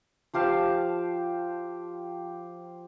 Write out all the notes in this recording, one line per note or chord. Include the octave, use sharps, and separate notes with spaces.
F3 G4 F5 A5